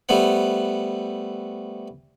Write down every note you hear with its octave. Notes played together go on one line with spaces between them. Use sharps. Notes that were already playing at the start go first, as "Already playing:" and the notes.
G3 A3 B3 C5 F#5